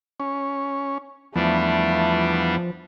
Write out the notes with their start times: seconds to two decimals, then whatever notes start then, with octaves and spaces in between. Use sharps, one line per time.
0.20 C#4
1.36 E2 F3 G3 A3 B3 D4